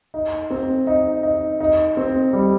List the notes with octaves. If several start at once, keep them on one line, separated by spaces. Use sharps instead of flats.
D#4
C4
D#4
D#4
D#4
C4
G3